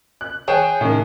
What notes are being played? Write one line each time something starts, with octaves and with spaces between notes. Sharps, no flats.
F#6
G#4 C#5 G5 E7
A2 D#3